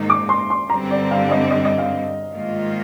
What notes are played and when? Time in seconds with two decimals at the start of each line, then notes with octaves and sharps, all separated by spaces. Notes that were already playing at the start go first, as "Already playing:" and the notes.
Already playing: G#2 D#3 A#3 D#4
0.10 D6
0.29 C6
0.50 C6
0.70 G2 D3 G3 C4 A#5
0.91 D5
1.11 F5
1.31 D#5
1.51 D#5
1.65 D#5
1.78 F5
2.32 G#2 D#3 A#3 F4